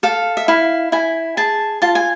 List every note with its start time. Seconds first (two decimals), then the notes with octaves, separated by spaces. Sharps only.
0.03 A4 F5
0.37 E5
0.48 E4 F5
0.92 E4 G#5
1.37 G#4 A5
1.82 F4 A5
1.95 G#5